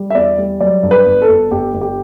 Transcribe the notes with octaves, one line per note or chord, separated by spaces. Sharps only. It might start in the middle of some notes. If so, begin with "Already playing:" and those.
Already playing: G3
E5
E2 D5
G3
F#3 D5
G2
B4
G1
A4
G1
G1 G4
G1
G4